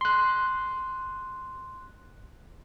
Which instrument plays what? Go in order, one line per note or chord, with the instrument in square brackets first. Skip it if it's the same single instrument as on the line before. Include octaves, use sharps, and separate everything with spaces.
[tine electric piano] C6 F#6